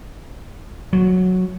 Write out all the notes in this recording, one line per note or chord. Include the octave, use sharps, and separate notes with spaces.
F#3